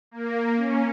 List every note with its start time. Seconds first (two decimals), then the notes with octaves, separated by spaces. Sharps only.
0.11 A#3
0.57 C#4